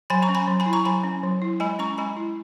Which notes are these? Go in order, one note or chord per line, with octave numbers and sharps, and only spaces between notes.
F#3 G#5 B5
A#5 C#6
C#4
G#5 B5
F#3
G#5 B5
E4
A#5 C#6
F#3 G#5 B5
C#4
F#3
E4
G#3 G#5 B5
C#4 A#5 C#6
G#3 G#5 B5
E4